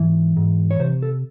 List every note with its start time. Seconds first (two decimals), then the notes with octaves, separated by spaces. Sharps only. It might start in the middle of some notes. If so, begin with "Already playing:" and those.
Already playing: G#2 E3
0.37 G#2
0.71 C#5
0.79 C3 C5
1.02 A4